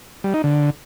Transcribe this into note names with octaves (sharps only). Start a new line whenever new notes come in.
G3
D#4
D3